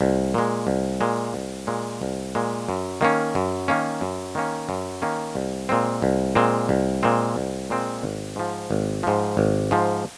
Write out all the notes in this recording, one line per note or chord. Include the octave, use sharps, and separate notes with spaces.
C2
A#2 G#3
C2
A#2 G#3
C2
A#2 G#3
C2
A#2 G#3
F#2
D#3 A#3 C#4
F#2
D#3 A#3 C#4
F#2
D#3 A#3 C#4
F#2
D#3 A#3 C#4
C2
A#2 G#3 C4
C2
A#2 G#3 C4
C2
A#2 G#3 C4
C2
A#2 G#3 C4
G#1
G#2 F3
G#1
G#2 F3
G#1
G#2 F3